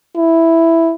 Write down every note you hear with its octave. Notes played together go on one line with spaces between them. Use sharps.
E4